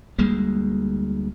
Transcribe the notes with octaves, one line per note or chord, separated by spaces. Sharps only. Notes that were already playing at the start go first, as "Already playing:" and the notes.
D2 G3 G#3 A#3